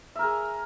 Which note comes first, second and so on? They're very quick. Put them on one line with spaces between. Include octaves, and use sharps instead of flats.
E5 A#4 G#4